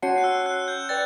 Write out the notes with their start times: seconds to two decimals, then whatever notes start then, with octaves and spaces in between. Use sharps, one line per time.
0.02 C#4 F#4 C#5 F#5 A5 C#7
0.18 F#6
0.24 E6
0.46 F#6
0.68 G6
0.89 B4 D5 G5 A6